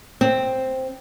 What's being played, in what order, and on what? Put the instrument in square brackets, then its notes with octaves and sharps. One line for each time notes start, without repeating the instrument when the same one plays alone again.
[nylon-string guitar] C4